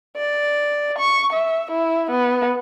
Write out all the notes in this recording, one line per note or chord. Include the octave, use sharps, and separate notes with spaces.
D5
C#6
E5
E4
B3